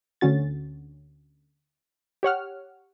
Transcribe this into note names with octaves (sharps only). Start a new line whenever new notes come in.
D2 D3 C#4 F#4 A6
G4 C#5 F#5 F6